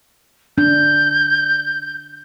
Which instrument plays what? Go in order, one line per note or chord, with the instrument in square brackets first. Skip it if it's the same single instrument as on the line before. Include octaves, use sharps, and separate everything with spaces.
[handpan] D4 [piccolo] G6